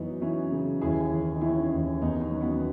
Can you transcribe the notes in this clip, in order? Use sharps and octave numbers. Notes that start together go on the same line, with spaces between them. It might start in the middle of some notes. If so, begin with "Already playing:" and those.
Already playing: F#2 E3 B3 D#4
E3 C#4 E4
C#3
D#2 E4 G#4
E3
D#4
E3 C#4 E4
D#2
D#2 B3 D#4
D#4
C#4
F#3
B3